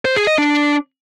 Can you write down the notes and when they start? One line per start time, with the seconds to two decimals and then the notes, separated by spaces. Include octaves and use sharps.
0.05 C5
0.16 G#4
0.27 D#5
0.38 D4